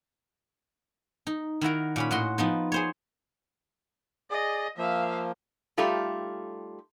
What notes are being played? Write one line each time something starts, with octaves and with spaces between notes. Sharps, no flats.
D#4
D#3 E4 F#4 A#4
A#2 C#4 B5
A2 F#4 D#5 C6
F3 B3 D#4
G#4 C5 C#5
G#4 D5 D#5
F3 A#3 E5 F5
G3 A3 D#4 F4 G4 A4